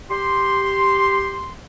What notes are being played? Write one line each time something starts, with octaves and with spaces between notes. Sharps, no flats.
G4 C6